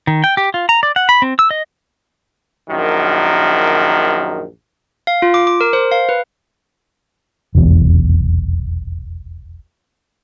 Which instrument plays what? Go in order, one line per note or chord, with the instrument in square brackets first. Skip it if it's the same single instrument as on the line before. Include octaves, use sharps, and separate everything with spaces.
[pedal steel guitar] D#3
G5
G4
F4
A#5
D5
F#5
B5
C4
E6
D#5
[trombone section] A#1 F#2 D#3
[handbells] F5
F4
D6
D6
A#4
C5
F5
B4
[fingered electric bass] F1 B1 E2